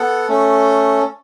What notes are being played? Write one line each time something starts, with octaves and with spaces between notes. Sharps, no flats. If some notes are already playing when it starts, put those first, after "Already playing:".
Already playing: B3 A4 F#5
A3 C#4 A4